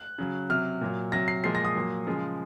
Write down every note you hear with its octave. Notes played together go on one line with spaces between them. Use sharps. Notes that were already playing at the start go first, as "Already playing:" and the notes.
Already playing: F#6
C#3 F#3
C3 F#3 F6
A#2 F#3
C3 F#3 A#6
C7
A#2 F3 G#3 C7
A#6
D#6
A#2 F#3
C#3 F3 G#3